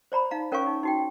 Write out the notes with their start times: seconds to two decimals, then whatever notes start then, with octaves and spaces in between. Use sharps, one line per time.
0.12 C5 D5 A#5 B5
0.31 D#4 F5 A#5
0.52 C#4 A#4 C#5 F5 G#5 C#6
0.66 D#4
0.83 D#4 F#4 G5